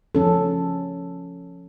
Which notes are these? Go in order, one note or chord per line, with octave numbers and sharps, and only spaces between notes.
F3 C#4 A4